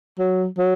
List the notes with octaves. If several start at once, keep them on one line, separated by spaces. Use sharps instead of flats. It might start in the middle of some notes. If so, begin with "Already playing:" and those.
F#3
F#3